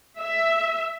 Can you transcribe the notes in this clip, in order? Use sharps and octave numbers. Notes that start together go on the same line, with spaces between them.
E5